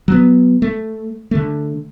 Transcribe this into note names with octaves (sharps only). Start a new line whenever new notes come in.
F#3 B3
A3
D3 A3